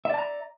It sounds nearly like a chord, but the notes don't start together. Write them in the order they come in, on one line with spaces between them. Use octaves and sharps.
E5 D5 A5 A#5